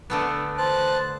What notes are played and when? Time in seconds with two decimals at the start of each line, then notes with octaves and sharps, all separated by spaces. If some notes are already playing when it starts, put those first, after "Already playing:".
0.10 D3 A3 B3
0.58 C5 A5 F#6